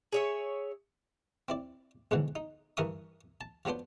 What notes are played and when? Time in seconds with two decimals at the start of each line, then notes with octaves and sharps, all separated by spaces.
0.12 G#4 C#5 E5
1.48 C4 E4 D5
2.11 B1 G#2 B2 D3 E3 F#3
2.36 D#4
2.77 G2 E3 A#4 E5 C#6 D#6
3.41 A5
3.65 F3 F#3 B3 D4 C5